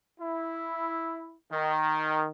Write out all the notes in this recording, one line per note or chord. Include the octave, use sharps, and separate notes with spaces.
E4
D#3